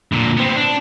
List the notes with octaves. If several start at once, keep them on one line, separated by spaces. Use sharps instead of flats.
A#2 D3
B3 C4
D4